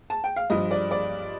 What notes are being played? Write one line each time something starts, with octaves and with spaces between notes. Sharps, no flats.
A5
G5
F5
G2 F3 D#5
D5
D5